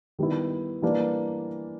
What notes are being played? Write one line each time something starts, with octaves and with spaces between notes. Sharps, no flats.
D#3 G3 B3 E4
E3 G3 A#3 D4